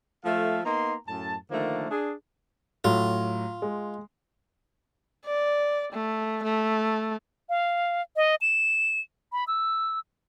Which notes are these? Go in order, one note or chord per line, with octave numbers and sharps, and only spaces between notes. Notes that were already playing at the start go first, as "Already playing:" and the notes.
F3 A3 A4 E5 F5
A#3 B3 D#4 A#5 C6
F#2 A2 A5
D3 D#3 F3 A3 A#3
D4 G#4
A2 F#3 F4
G#3
D5
A3
A3
F5
D#5
E7
B5
E6